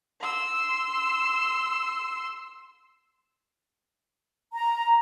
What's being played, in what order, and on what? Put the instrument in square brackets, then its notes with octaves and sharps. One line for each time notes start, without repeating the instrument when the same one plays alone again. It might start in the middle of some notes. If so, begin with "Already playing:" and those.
[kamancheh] C6 E6
[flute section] A#5